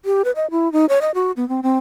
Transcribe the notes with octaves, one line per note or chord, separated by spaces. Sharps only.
G4
B4
D#5
E4
D#4
C#5
D#5
F#4
B3
C4
C4